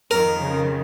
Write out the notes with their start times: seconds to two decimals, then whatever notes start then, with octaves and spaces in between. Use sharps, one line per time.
0.11 F2 D#3 A#4
0.42 C#3